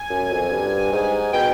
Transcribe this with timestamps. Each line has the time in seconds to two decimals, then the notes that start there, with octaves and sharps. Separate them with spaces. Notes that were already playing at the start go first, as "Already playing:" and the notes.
Already playing: G#5
0.10 F#2
0.31 F2
0.52 G2
0.93 G#2
1.33 B2 G5